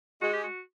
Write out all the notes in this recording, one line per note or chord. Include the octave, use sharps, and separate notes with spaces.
G#3 F#4
G4
F#4